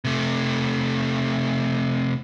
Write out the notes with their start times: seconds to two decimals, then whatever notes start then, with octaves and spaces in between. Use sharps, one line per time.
0.05 C3 A3